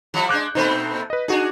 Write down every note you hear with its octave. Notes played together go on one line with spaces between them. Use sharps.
F3 G3 E4
G#3 D4 D6 F#6 G6
A#2 A3 C4 D#4 C5
B4 D#5
D4 D#4 F#4 G#4